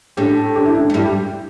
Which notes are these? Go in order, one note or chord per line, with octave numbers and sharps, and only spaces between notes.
A2 A3 D4 G4
D4 G4
E4
D4
A3
G2 G3 E4
G4